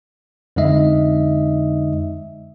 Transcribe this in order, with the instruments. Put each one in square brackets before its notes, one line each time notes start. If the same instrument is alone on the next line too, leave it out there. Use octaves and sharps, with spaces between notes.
[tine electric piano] F2 D3 G#3 D#4 D#5 E5